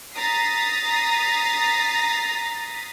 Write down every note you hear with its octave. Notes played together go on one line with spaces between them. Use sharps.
A#5 D#6 A6 B6 C7